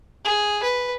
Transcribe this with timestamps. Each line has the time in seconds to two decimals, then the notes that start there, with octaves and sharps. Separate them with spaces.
0.25 G#4
0.63 B4